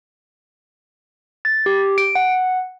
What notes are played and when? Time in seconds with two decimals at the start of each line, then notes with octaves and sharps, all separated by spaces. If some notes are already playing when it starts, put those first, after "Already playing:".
1.45 A6
1.66 G4
1.98 D7
2.15 F#5